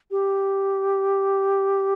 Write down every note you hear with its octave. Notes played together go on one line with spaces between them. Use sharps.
G4